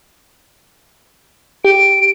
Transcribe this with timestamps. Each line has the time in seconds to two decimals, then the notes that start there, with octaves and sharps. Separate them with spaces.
1.65 G4 D7